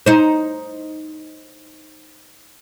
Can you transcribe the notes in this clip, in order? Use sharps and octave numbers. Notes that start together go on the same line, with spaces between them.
D#4 C5